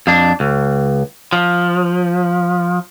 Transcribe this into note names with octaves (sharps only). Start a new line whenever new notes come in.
F2 D4
C#2
F3